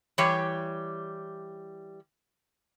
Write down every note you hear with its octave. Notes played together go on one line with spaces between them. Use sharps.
E3 G3 G4 C#5